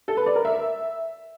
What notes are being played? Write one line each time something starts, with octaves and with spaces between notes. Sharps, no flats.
A4
B4
D5
A#4
E5